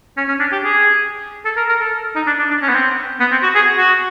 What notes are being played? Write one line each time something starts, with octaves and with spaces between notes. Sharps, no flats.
C#4
C#4
D4
G4
G#4
A4
A#4
A#4
A4
D#4
D4
D4
D4
C#4
B3
C4
B3
C4
F#4
G#4
F#4